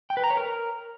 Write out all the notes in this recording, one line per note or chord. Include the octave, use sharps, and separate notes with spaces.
G5
B4
A#5
C#5
A#4